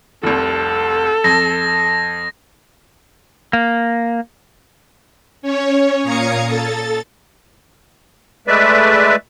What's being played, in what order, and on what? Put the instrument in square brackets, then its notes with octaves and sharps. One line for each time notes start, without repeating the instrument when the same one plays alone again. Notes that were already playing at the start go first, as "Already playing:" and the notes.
[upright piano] F1 C2 [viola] A4
[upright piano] F2 [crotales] A#6
[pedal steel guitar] A#3
[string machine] C#4 C#5
A#2 F5 A#5 D#6 G#6 C#7
A4 A6
[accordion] G#3 A3 B4 D5 E5